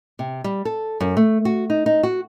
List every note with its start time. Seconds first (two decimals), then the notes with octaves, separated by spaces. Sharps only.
0.19 C3
0.44 G3
0.65 A4
1.00 F#2
1.17 A3
1.45 F#4
1.70 D#4
1.86 D#4
2.03 F#4